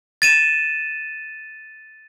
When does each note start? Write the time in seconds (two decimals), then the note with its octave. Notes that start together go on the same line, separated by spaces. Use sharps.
0.22 A6 D#7 E7